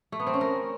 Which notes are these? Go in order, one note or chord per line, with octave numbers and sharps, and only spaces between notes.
A3
B3
C4
C#4
A#4